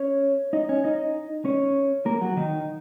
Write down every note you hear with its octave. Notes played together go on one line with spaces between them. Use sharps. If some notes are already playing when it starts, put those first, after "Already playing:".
Already playing: C#4 C#5
D#4 D#5
C#4 C#5
D#4 D#5
C#4 C#5
A#3 A#4
F#3 F#4
D#3 D#4